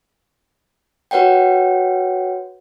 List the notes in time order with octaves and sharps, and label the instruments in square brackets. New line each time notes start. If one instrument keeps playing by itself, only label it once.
[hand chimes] F#4 B4 C#5 F#5 G5